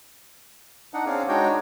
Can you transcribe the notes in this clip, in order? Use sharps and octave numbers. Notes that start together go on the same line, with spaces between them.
D4 D#4 F#5
C4 C#4 G#4 D5 F5
G#3 D4 D#4 F#4 C#5 G5